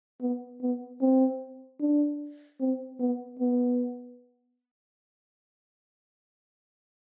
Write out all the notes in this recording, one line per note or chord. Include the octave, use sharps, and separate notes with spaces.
B3
B3
C4
D4
C4
B3
B3